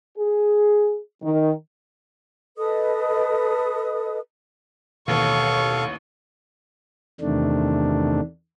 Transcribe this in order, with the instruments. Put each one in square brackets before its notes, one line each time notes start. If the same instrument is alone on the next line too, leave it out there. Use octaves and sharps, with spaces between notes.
[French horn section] G#4
D#3
[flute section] A4 B4 D#5 D#6
[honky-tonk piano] A1 D#2 [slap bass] B2 [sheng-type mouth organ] A4 F5 [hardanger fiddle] C#5 C#6
[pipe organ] E2 C3 D#3 A3 D4